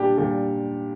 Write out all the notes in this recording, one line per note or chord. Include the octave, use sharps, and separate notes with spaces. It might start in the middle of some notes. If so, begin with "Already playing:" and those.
Already playing: A#2 G3 D4 G4
A#2 G4